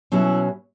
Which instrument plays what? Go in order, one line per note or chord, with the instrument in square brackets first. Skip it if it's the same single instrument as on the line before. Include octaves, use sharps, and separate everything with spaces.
[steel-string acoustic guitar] B2 F#3 C#4 E4